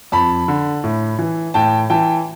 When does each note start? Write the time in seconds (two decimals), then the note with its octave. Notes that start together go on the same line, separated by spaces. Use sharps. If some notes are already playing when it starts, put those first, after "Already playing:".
0.12 F2 A5 B5
0.48 D3
0.84 A2
1.19 E3
1.54 A2 G5 A5
1.90 E3 G5 A5